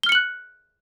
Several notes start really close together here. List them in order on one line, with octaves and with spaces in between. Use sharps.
G7 F6 C#7 F#7 F#6